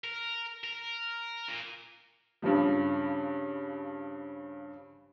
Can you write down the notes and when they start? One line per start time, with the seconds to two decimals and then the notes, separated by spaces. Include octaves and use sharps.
0.04 A#4
0.64 A#4
1.49 A#2
2.42 G2 C#3 F3 G3